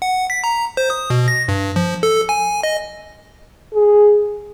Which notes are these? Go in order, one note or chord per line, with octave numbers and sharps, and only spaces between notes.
F#5
B6
A#5
C5
D#6
B2
A#6
G2
F3
A4
G#5
D#5
G#4